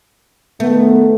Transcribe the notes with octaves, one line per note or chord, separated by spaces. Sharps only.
D#3 A3 B3